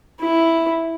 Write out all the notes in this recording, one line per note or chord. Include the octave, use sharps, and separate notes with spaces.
E4